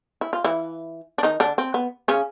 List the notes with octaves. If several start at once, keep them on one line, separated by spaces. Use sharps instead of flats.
E4
F4
E3 E4
D4
D#3 D#4
D3 D4
C4
B3
C#3 C#4